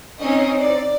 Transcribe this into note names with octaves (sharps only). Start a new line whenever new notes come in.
C4 C#4 D#4 C5 D#5
D5